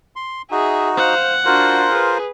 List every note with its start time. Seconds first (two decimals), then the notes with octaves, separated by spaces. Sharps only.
0.16 C6
0.51 D#4 F#4 G#4 E5
0.97 C5 F5 F#5
1.45 D4 F4 F#4 A#4 C5
1.91 G#4 B4